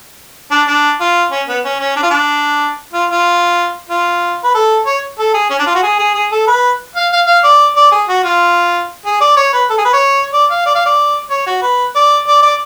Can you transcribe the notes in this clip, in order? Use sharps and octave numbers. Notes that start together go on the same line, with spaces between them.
D4
D4
F4
C#4
B3
C#4
C#4
D4
F4
D4
F4
F4
F4
B4
A4
C#5
A4
G#4
C#4
D4
F4
F#4
G#4
G#4
G#4
A4
B4
F5
F5
F5
D5
D5
G#4
F#4
F4
G#4
D5
C#5
B4
A4
G#4
B4
C#5
D5
F5
D5
F5
D5
C#5
F#4
B4
D5
D5
D5